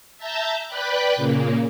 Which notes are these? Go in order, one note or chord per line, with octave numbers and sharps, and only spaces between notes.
E5 A5 A#5 G6 A6
B4 D5 G5 B5 F#6
A#2 C#3 A#3